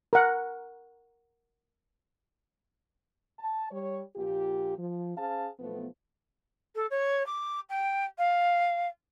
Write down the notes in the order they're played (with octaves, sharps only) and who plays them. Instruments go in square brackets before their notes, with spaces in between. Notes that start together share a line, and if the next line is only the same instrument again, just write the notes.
[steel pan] A#4 F#5
[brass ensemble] A5
G3 C#5
A#1 A#2 F4 G4
F3
C#4 G#4 C5 F5 A5
B1 F3 A3 B3
[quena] A4
C#5
D6
G5
F5